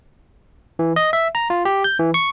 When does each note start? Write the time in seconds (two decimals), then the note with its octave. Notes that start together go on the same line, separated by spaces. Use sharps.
0.79 E3
0.96 D#5
1.13 E5
1.35 A#5
1.50 F4
1.65 G4
1.84 G6
1.99 E3
2.14 C#6